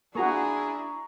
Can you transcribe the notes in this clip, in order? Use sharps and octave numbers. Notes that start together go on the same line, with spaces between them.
A#3 D4 E4 F#4 G#4 A#5 C#6